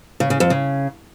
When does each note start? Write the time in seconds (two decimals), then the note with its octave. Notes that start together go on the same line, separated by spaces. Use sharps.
0.20 C#3
0.30 C#3
0.40 F2
0.50 C#3